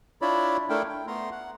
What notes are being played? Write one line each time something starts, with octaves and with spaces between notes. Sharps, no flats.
D4 E4 F4 C#5 D5 B5
A3 D4 E4 A4 A#4 G5
G5
A3 B3 A#5 C6
F#5